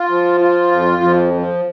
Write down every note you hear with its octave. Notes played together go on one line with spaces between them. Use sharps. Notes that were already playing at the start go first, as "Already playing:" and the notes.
Already playing: F4
F3
F4
F2
F3
F3